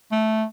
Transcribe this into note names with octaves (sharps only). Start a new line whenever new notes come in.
A3